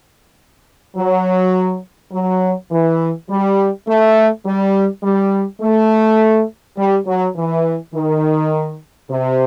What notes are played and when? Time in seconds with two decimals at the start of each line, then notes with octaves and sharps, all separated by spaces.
0.96 F#3
2.12 F#3
2.70 E3
3.29 G3
3.87 A3
4.45 G3
5.03 G3
5.61 A3
6.77 G3
7.07 F#3
7.35 E3
7.94 D#3
9.09 C3